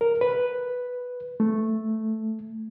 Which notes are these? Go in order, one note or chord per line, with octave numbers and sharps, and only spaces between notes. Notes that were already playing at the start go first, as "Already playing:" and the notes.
A#4
B4
A3